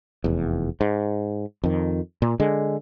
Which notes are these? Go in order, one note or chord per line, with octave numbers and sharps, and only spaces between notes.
F1 E2
G#2
F2 D#3
A#2
D3 G#3